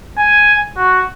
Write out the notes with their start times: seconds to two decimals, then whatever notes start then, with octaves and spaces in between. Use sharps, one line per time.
0.17 G#5
0.77 F#4